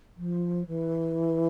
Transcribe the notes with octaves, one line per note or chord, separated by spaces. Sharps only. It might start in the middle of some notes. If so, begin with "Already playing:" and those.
F3
E3